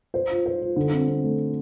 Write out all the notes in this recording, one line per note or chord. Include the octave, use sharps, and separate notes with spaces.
C5
F4
C5
F4
D3
C4
C4
A3